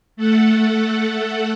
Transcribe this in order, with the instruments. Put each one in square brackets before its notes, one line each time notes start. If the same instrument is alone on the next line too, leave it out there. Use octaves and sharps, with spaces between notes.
[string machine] A3 A4 F#5